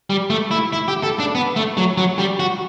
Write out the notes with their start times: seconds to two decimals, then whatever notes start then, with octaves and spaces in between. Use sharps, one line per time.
0.10 G3
0.30 A3
0.51 E4
0.73 E4
0.88 G4
1.03 A4
1.19 D4
1.35 B3
1.56 A3
1.77 F#3
1.98 F#3
2.19 G3
2.40 F#4